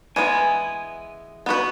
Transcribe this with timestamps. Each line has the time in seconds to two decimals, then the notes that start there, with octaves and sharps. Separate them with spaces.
0.16 E3 G#3 B3 E4 G#5
1.46 B3 F#4 B4